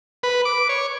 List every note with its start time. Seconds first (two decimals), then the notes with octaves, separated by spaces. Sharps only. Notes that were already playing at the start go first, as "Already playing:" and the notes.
0.23 B4
0.45 D6
0.69 C#5